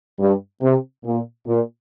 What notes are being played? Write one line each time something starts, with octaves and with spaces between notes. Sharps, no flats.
G2
C3
A#2
A#2